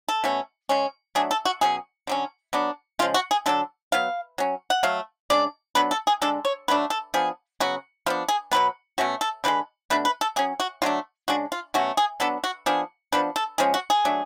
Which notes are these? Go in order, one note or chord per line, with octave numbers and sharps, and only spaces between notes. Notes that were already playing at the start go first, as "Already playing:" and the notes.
A4
B2 A3 C#4
C#3 G#3 C#4
F#3 A3 D4 G#4
A4
F#4
B2 F#3 C#4 G#4
D3 F#3 C#4
F#3 B3 D4
C#3 F3 G#3 F4
F#4
G#4
D3 F#3 B3 D4 A4
F#3 B3 F5
F#3 C#4
F#5
F#3 A3 F5
C#3 G#3 D4 D5
F#3 B3 D4 B4
A4
G#4
D3 G#3 D4 A4
C#5
D3 F#3 A3 D4 B4
A4
F3 B3 D4 G#4
C#3 F#3 B3 F#4
F3 B3 D4 F4
G#4
B2 F#3 B3 B4
B2 A3 C#4 F#4
A4
D3 F3 G#3 B4
B2 A3 D4 B4
B4
A4
F#3 C#4 G#4
F#4
D3 F#3 A3 D4 F4
C#3 G#3 D4 F#4
F4
B2 F#3 A3 C#4 F#4
G#4
F#3 B3 D4 A4
F#4
F3 B3 D4 G#4
F3 B3 D4 B4
A4
F3 G#3 C#4 G#4
F#4
G#4
F#3 A3 D4